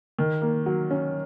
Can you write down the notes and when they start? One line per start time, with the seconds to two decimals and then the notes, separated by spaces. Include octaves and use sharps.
0.19 D#3
0.42 A#3
0.66 F#3
0.91 C#4